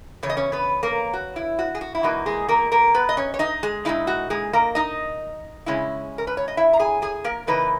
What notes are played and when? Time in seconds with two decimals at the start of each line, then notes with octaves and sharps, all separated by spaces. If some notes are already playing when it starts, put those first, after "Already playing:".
0.23 E2 C#3 C#5
0.30 D#5
0.37 C#4 C#5
0.52 B3 B4
0.83 A#3 A#4
1.13 F#4
1.36 E4
1.59 F#4
1.75 G#4
1.81 F#4
1.95 E4
2.03 E2 B2 A#3 D#4 F#4
2.26 G#3 G#4
2.48 A#3 A#4
2.72 A#3 A#4
2.94 B3 B4
3.09 D#5
3.17 C#4 C#5
3.34 C#5
3.39 D#4 D#5
3.63 G#3 G#4
3.85 A#2 G#3 D#4 E4
4.07 F#4
4.30 G#3 G#4
4.53 A#3 A#4
4.75 D#4 D#5
5.66 C#3 G#3 C#4 E4
6.18 A#4
6.27 B4
6.37 C#5
6.48 D#5
6.57 E4 E5
6.73 A#5
6.80 G#4 G#5
7.02 G#4 G#5
7.24 A#3 A#4
7.47 C#3 E3 A#3 D#4 B4